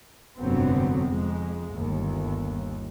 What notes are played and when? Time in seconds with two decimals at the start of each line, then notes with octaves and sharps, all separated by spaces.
0.40 F1 G2 D3 F#3 B3 C4
1.07 F2 G#3
1.74 G1 D#2